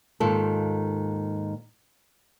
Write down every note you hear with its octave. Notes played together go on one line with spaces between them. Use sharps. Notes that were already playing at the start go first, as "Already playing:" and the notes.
D#2 G#2 D#3 F4 A4